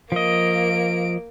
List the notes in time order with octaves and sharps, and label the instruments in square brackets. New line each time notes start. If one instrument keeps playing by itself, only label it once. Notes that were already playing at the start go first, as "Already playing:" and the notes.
[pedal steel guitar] F3 D#5 [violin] A#3 D7